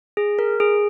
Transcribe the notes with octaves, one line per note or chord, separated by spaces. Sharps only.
G#4
A#4
G#4